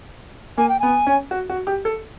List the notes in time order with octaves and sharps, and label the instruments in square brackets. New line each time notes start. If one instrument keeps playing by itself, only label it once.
[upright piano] A#3 [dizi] G#5
[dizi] G5
[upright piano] B3 [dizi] G#5
[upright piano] C#4
F#4
F#4
G4
A4